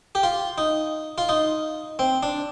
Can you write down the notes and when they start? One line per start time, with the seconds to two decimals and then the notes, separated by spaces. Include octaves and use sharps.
0.15 G4
0.23 F4
0.58 D#4
1.18 F4
1.29 D#4
1.99 C4
2.23 D4